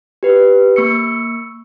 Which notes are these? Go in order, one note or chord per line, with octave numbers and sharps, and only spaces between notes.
G4 B4
A#3 C#6 E6 C#7